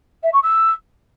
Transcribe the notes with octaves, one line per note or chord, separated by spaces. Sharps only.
E5
C#6
E6